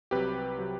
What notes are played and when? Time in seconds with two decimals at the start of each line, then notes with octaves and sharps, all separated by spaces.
0.11 C2 C3 F#3 G4 B4
0.59 C3 F#3